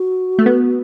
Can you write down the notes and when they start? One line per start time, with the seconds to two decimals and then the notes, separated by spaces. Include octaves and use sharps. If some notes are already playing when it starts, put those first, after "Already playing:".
Already playing: F#4
0.39 A3
0.46 B3